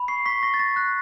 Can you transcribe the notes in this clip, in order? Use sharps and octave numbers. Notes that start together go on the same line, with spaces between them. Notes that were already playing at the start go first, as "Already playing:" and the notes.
Already playing: B5
C#6 C7
C#6 B6
C#6 A#6
A6
C#6 A#6
F#6 A#6